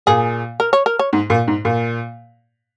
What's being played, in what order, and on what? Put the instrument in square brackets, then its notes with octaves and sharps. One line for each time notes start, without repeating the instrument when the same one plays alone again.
[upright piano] A#2 [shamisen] G#4
[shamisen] A#4
C#5
A#4
C#5
[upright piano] G#2
A#2
G#2
A#2